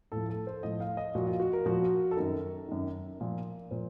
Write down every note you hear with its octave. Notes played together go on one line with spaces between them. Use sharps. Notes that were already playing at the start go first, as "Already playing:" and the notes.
A2 F3 A4
A4
C5
A2 F3 D#5
F5
D#5
A#2 F3 F#4
F4
F#4
A#4
A#2 F3 F#4
A4
F#2 D#3 A#4
F#2 D#3
A#2 F3
A#2 F3 C5